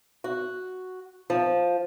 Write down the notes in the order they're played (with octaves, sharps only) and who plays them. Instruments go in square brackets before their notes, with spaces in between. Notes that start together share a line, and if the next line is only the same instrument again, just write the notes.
[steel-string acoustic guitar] F#4
F3